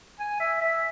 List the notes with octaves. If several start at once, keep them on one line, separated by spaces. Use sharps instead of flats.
G#5
E5
E5